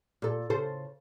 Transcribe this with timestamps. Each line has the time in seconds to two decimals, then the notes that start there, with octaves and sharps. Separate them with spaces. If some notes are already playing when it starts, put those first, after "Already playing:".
0.22 A#2 A4
0.50 C#3 A4 C5